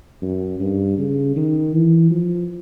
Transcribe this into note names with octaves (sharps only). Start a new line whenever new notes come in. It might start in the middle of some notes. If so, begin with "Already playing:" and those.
F#2
G2
C#3
D#3
E3
F3